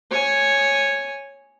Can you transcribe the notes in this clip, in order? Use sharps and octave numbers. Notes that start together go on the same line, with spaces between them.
C#5 G#5